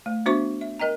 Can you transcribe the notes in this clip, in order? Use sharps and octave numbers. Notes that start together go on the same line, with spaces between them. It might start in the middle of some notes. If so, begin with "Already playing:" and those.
A3
B3 D4 F#4 C5 E5 C#6
E5
A#4 D#5 G5 A#5